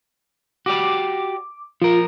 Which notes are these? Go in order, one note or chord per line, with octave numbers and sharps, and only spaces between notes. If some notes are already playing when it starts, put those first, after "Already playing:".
F#4 G4 D5 D6
F3 F4 A#4